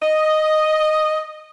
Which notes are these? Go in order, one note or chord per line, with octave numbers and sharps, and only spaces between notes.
D#5